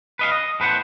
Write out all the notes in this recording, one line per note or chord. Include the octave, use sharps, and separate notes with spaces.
B4 D#5 F5
D#5
A2 B4 C5 F#5